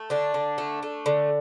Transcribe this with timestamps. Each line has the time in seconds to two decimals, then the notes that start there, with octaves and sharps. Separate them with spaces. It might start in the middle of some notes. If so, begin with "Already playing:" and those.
Already playing: A3
0.10 D3 D4
0.34 D3
0.58 A3
0.83 A3
1.06 D3